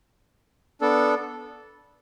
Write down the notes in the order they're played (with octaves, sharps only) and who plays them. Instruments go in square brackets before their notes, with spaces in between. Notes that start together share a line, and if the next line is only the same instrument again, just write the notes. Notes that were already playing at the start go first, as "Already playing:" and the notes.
[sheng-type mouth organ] B3 D4 A4